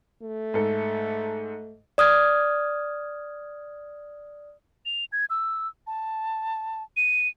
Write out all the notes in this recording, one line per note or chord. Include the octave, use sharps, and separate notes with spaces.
A3
G#2 A4
D5 D#6 F6 G#6
F7
G#6
E6
A5
D#7